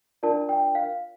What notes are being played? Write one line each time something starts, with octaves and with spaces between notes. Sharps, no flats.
D4 F4 A#4 D5 A5
G5
F5